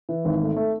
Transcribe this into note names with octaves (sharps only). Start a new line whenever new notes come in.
E3
G#1
A3
A3